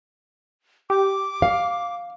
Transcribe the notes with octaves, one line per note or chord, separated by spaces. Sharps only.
G4 D6
F5